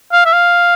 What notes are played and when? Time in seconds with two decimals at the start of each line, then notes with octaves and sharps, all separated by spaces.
0.12 F5
0.25 E5
0.33 F5